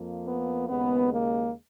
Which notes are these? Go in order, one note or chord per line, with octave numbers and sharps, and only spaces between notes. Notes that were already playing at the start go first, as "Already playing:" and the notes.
Already playing: F2 F3 A#3
B3
D#2 C#3 G#3 B3
A#3